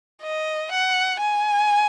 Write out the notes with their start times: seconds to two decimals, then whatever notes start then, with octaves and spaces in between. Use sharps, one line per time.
0.22 D#5
0.72 F#5
1.20 G#5